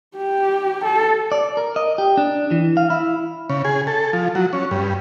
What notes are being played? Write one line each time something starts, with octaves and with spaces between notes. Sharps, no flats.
G4
A4
D5
A#4
D#5
G4
D4
E3
F5
E4
C#3
G#4
A4
F3
F#3
C#4
G2